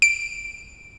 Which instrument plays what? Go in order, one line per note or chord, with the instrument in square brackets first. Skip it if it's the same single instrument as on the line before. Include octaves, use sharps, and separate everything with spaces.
[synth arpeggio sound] D7